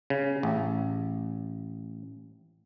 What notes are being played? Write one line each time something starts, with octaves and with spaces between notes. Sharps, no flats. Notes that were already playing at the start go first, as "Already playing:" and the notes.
C#3
A1